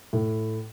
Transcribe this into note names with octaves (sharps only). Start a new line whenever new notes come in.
A2